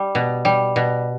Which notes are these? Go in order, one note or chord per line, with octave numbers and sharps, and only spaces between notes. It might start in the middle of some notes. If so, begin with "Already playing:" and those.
Already playing: G3
B2
G3
B2